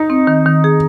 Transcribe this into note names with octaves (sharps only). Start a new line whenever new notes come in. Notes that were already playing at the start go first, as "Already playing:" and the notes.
Already playing: D#4
C4
D#3
D#3
G#4